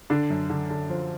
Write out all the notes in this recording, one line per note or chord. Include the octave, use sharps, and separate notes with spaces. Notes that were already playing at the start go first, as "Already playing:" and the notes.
D3 D4
F#2
D3
D3
F3